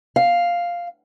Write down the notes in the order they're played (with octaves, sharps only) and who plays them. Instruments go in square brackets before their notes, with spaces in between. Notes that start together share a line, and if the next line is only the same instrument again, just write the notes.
[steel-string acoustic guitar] F5